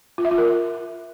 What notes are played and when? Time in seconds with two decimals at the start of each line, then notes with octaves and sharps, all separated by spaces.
0.18 F4
0.25 E5
0.31 F4
0.38 A#4